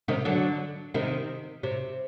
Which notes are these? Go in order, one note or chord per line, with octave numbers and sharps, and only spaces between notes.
C3 D#3
D3 F#3
C3 D#3
C3